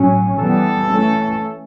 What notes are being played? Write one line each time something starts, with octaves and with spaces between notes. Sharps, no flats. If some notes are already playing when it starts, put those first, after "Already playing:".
Already playing: A2 F#3 C#4
E3 G3 B3 A4
E3 A3 C#4